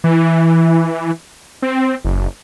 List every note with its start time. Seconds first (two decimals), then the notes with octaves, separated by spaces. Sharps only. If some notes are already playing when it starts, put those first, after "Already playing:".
0.04 E3
1.62 C4
2.05 F#1